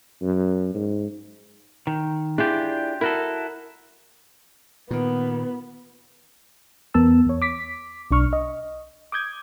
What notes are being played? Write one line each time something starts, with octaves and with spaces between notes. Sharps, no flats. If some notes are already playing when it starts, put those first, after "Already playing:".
F#2
G#2
D#3
D4 E4 F4 G4 G#4 D5
E4 F#4 A4 A#4
A#2 D#3 B3
E2 B3 A#4 A5 E6
E2 C#5
D6 B6
B1 D4 C#6 F6
D#5
D6 D#6 G6 G#6